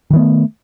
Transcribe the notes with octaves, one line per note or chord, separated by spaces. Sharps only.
D#3 E3 A3 B3